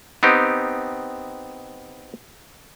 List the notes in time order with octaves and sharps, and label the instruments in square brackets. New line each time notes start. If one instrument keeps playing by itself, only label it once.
[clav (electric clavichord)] B3 C4 D#4 G4